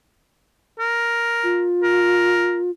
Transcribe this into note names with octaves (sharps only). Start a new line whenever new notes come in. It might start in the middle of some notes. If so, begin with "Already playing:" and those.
A#4
F4
A#4